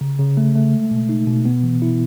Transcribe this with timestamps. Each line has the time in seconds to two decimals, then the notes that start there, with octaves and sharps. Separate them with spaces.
0.01 C#3
0.19 C#3
0.37 A3
0.55 A3
0.73 G#3
0.91 B2
1.09 D#4
1.27 B2
1.45 B3
1.63 E3
1.82 E4